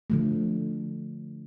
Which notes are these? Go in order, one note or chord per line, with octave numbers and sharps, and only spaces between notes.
D3 F3 A3